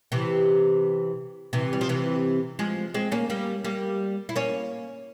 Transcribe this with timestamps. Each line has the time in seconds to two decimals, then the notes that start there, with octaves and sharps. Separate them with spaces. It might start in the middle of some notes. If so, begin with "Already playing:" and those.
0.12 C3 E3
1.53 C3 E3
1.73 G3
1.81 F3
1.89 C3 E3
2.59 F3 G#3
2.94 G#3 C4
3.12 A#3 C#4
3.30 G3 A#3
3.64 G3 A#3
4.29 E4
4.36 A#3 C#4